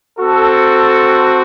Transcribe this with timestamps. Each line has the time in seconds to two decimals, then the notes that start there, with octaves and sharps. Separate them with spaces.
0.18 C4 F#4 A4